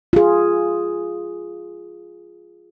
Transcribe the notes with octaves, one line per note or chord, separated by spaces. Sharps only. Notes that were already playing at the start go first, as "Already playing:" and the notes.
F4 G#4